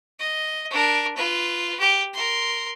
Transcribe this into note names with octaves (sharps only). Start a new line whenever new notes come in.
D#5
D4 A#4
F4 B4
G4
A#4 C6